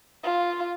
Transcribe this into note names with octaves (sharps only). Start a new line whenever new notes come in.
F4